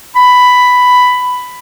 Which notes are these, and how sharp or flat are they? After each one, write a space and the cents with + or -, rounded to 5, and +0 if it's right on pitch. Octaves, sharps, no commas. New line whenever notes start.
B5 +10